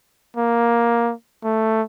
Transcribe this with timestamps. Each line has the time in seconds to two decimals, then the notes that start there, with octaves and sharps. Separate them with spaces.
0.36 A#3
1.44 A3